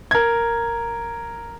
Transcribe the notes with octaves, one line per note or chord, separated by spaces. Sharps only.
A#4 G#6